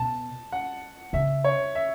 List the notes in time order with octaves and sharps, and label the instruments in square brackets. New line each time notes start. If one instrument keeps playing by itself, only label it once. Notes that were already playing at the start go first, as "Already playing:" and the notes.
Already playing: [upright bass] B2 [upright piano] A5
[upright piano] F#5
[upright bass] C#3 [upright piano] E5
[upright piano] C#5
E5